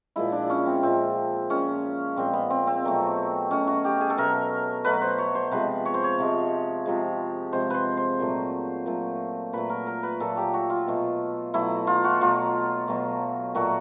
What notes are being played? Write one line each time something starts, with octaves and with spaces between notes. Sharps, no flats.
A#2 F3 G#3 E4
D4
C#4
C4
A#2 F3 G#3 C4
A#2 F3 G#3 C#4
A#2 F3 G#3 C4
B3
C4
C4
B2 F#3 A3
B2 F#3 A3 C#4
F#4
G4
G#4
A4
B2 F#3 A3 A#4
B2 F#3 A3 B4
C5
C#5
C5
C3 F3 G#3 B4
C#5
C5
C#5
C3 F3 G#3
C3 F3 G#3
C3 F3 G#3 C5
B4 C5
C5
A#2 F#3 A3
A#2 F#3 A3
A#2 F#3 A3 B4
A#4
A#4
B4
A#2 F#3 A3 A4
G4
F#4
F4
B2 F#3 A3
B2 F#3 A3 E4
F4
F#4
B2 F#3 A3 F4
B2 F#3 A3
A#2 F#3 A3 F#4